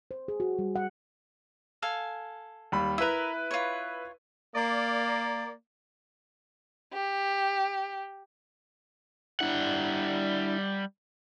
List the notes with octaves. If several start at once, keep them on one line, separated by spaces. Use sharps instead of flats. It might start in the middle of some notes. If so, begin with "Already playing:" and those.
C5
G#4
F#4
G3
F#5
A4 F5 G#5
D#2 G3 B5
E4 A#4 B4 E5
F4 C#5
A#3 D5
G4
G3 D4 E4 F#5